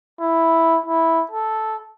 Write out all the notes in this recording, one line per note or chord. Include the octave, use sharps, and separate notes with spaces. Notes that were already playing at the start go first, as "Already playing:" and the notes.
E4
E4
A4